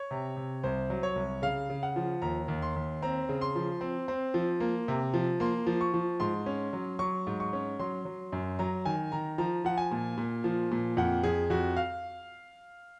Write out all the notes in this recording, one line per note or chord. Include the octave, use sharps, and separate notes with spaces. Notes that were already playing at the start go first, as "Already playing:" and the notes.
Already playing: C#5
C3
C3
C2 C5
F#3
C#5
C2
C#3 F5
C#3
F#5
F3
D#2 A#5
D#2
C6
D#2
C4 A#5
C#3
C6
F3
C4
C4
F3
A#3
C3
F3
A#3 C6
F3
C#6
F3
G#2 C6
C#4
F#3
F#3 C#6
G#2
C#6
C#4
F#3 C6
F#3
F#2
F#3 A#5
D#3 G#5
D#3 A#5
F3 A#5
F3 F#5
G#5
A#2
A#2
F3
A#2
F2 F#5
F2 G#4
F2 F#4
F5